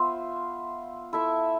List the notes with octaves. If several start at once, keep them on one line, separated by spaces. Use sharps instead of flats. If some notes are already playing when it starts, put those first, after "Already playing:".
Already playing: B3 F4 C5 E5
E4 A4 E5